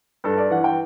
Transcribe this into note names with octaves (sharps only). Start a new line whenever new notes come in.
G2 A4
D5
E3 F#5
G5